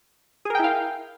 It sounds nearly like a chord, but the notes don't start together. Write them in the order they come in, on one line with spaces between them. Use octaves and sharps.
G#4 A#4 G5 E4 F5